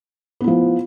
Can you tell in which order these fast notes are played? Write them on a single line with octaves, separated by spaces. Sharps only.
B3 E4 F3